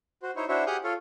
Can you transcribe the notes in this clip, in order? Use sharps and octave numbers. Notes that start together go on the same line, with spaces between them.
F#4 C5
D#4 E4 C5 C#5
D4 E4 F#4 C5 C#5 E5
G4 G#4 F#5 D#6 F6 G6
F4 A4 C#5 F5